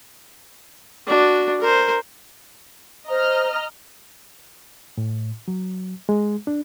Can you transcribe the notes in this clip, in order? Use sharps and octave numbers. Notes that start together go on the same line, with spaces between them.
D4 F#4
A#4 C5
C5 D#5 A#5 F6
A2
F#3
G#3
D4